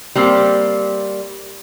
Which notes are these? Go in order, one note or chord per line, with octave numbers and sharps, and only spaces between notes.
G3 A#3 C4